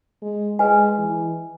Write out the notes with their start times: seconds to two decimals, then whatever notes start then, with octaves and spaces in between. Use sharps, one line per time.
0.22 G#3
0.59 G#3 B4 D#5 G#5
0.98 E3